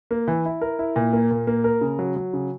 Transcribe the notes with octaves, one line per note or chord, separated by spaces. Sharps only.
A#3
E3
E4
A#4
E4
A#2
A#3
A#2
A#3
A#4
C#3
F#3
F#3
C#3